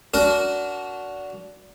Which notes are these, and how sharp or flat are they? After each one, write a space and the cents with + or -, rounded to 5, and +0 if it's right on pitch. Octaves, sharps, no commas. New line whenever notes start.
D4 -25 F#4 +0 A#4 +0